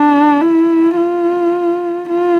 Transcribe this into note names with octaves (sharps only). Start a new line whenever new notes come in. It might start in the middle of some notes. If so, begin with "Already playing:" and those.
Already playing: D4
E4
F4
F4